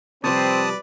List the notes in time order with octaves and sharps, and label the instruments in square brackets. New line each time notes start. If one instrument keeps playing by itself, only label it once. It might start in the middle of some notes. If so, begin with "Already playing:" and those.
[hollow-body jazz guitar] C3 F3 G3 [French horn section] C4 [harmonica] B4 D5 [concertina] A5 D#6